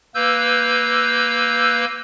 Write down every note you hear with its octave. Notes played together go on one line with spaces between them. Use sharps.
A#3 B4 E6 G6